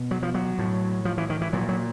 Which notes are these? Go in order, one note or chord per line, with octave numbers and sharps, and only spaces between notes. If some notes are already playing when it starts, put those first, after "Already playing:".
Already playing: B2
F#3
F3
F#3
A2
F3
E3
D#3
E3
A#2 F#3
F#3